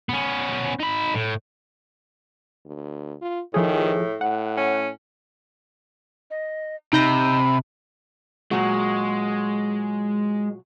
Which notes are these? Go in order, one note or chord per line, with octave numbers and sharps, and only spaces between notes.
B3 C#4
D#4 B5
A2
D2
F4
A2 D#3 F3 G#4
A2 F#5
C#4
D#5
C3 D#4 B5 G6 A#6
A#2 F#3 G#3 F#4